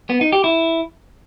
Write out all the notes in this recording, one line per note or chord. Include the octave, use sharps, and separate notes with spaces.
B3
D#4
G4
E4